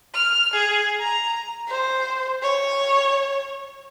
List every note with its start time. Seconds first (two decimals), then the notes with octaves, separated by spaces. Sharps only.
0.14 F6
0.54 G#4
1.00 A#5
1.68 C5
2.42 C#5